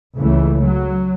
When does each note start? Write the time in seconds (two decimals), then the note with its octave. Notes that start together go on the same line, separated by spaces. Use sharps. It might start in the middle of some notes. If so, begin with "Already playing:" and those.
0.17 C#2 C#3 E3 A3
0.62 F#3